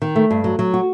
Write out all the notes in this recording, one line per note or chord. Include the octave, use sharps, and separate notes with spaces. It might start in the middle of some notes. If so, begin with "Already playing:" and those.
D#3
A3
G2
F#3
F#3
F#4